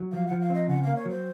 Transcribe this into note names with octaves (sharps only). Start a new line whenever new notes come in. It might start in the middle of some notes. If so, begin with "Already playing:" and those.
Already playing: F#3
F3 F5
F3 F#5
F5
C4 D#5
C#3 F#5
A#3 F5
C#5
F#3 C5